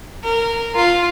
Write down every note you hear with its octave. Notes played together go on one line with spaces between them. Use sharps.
A#4
F4